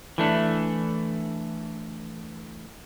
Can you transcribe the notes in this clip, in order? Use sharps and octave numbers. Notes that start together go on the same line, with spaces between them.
E3 A3 D4